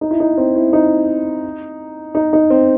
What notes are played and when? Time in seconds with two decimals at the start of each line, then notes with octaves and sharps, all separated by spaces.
0.01 D#4
0.11 E4
0.20 D#4
0.37 C4
0.55 E4
0.73 D#4
2.15 D#4
2.33 D#4
2.50 C4